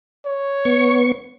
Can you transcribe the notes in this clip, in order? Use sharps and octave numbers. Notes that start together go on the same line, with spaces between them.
C#5
B3 C#6